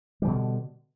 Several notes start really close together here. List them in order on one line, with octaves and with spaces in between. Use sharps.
G3 E3 B2 D3